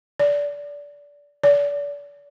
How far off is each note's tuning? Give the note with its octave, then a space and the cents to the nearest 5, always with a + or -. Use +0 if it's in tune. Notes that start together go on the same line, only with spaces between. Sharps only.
D5 -20
D5 -35